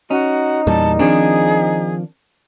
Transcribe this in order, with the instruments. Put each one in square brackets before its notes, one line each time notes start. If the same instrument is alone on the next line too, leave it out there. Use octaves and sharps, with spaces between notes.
[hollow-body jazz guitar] C#4 [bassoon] D#4 [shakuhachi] F#4
[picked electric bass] E2 A#2 G3 [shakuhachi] A5
[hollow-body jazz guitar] D#3 C4 D4 [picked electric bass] F3 [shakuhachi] G#4